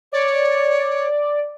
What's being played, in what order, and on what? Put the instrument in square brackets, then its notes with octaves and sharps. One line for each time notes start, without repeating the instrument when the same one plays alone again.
[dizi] C#5 [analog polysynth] D5